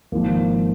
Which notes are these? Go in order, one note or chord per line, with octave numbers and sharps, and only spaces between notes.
G#1 G#2 F3 A#3